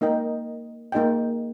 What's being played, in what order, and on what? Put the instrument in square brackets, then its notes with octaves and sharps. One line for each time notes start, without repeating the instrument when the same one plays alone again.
[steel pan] A#3 D#4 A#4 D#5 G5
A#3 D#4 G#4 D#5 G5